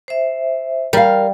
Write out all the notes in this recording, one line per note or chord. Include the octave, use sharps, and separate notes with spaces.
C5 E5
G3 A#4 F5